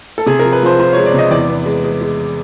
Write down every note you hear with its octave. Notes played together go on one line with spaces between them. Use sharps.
A4
C3 G#4
F3 A#4
B4
F3 C5
F3 C5
G#3 C#5
D5
C3 D#5
E2 D5
B3
G#3
G#3
G#3